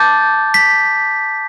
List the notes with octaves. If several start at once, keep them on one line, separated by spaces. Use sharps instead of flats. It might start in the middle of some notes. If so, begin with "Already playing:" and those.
Already playing: A5 D6 G6 A6
B6